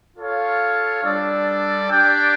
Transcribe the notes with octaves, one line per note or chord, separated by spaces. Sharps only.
F4 A4 C#5 F5
G3 D4 A4 D5
D4 G4 D5 G5